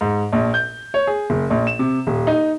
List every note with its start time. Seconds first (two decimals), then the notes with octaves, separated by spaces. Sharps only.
0.01 G#2
0.33 A#1
0.54 G6
0.94 C#5
1.07 G#4
1.30 F#1
1.50 A#1
1.67 E7
1.79 C3
2.07 D#1
2.27 D#4